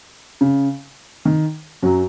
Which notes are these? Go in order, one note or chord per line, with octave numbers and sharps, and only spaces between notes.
C#3
D#3
F#2 F#3